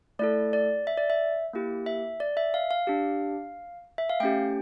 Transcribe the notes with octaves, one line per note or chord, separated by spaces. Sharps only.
A3 E4 A4 D5
D5
E5
D5
E5
A#3 E4 G4
E5
D5
E5
F5
F5
D4 G4
E5
F5
A3 C#4 G4 G5